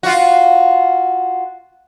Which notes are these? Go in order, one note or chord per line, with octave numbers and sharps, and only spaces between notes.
F4 F#4